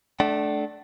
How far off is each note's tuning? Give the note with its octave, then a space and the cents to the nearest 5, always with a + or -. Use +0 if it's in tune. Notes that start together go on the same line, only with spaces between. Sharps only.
A3 -20 D4 +0 F#5 +40